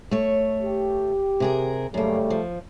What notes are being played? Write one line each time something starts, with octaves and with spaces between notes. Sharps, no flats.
A3 C#5
G4
C3 G#4 A#4
F#2 C#3 G3 A3 A#3
F3